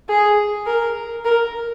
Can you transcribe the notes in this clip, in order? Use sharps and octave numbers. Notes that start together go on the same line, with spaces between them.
G#4
A#4
A#4